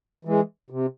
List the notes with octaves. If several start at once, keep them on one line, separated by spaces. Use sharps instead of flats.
E3 G#3
C3